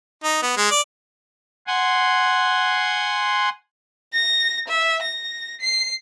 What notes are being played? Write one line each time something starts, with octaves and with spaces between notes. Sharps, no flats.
D#4
B3
G#3
D5
F#5 G#5 C6
A#6
E5
A#6
C7